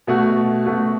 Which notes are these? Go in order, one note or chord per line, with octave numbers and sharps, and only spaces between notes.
B2 A3 F#4
B2 A3 F#4